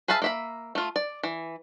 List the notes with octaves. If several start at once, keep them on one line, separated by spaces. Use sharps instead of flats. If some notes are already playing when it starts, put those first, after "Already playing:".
G#4 B4 E5 F5 A5
A#3 E5 B5
A3 F4
D5
E3